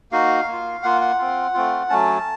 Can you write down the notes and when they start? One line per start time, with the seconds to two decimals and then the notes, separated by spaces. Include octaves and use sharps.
0.12 A#3 D#4 F#4 F5
0.48 A#3 F4
0.83 A#3 F4 F#5
1.01 F#5
1.18 C4 F4
1.54 A3 C4 F4
1.90 F#3 A3 C#4 A5